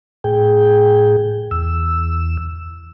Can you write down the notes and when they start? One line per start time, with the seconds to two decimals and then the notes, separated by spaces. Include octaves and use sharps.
0.24 A2 G#4 G5
1.51 E2 E6